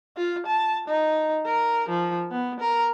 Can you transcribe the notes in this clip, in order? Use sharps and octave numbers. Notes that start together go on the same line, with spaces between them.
F4
A5
D#4
A#4
F3
B3
A#4